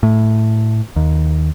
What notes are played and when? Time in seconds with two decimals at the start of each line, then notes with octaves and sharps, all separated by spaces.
0.03 A2
0.96 D#2